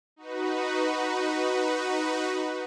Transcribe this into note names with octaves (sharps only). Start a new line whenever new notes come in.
D#4 F#4 B4